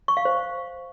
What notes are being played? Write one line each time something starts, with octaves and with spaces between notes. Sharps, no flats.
C#6
F5
C5